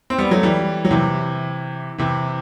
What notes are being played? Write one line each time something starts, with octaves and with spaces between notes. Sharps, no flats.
C4
G3 B3
F#3 A3
E3 G3
F#3
C3 E3
C3 E3